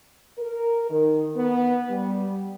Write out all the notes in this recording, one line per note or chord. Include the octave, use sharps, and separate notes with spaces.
A#4
D#3
B3
G3